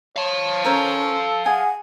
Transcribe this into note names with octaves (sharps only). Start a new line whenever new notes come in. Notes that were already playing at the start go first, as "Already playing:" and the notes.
C#5 F5 A5
C#4 A4 A#4 C5 C#5
G#4 F#5 G#5